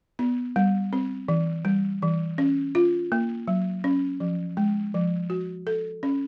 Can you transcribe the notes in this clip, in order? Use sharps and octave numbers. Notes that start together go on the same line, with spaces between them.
B3
G3
C4
E3
G3
E3
C#4
F4
A#3
F#3
C#4
F3
G#3
F3
F#4
A4
C#4